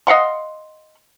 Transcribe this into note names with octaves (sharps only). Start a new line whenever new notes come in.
D#5 F5 F#5 C6